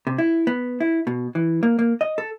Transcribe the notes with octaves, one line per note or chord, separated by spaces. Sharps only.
C3
E4
B3
E4
B2
E3
A#3
A#3
D#5
A4